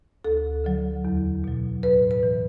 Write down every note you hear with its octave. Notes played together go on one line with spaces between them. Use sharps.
D2 A4
D3 F#3
E2
B2 F#3
A2 B4
B4
E3